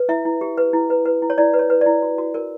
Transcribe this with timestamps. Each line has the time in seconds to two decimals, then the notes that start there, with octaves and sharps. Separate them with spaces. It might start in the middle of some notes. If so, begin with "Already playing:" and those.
Already playing: B4
0.09 E4 E5
0.25 E4
0.41 G4
0.58 B4
0.73 E4
0.90 B4
1.05 B4
1.22 E4
1.30 C#5
1.38 E4 D5
1.54 B4
1.59 C#5
1.70 B4
1.81 E4 D5
2.02 F#4
2.18 F#4
2.34 A#4